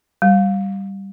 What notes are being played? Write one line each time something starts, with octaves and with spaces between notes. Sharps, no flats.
G3